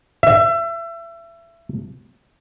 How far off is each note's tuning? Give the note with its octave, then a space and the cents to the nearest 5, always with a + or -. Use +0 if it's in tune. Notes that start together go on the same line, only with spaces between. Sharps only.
E5 +30